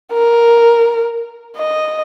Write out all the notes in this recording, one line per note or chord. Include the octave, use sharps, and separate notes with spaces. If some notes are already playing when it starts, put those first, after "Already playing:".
A#4
D#5